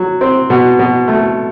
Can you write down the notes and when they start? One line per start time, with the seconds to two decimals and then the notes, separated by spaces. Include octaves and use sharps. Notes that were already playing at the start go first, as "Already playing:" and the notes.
Already playing: F#3
0.21 C4
0.50 B2
0.79 B2
1.08 A3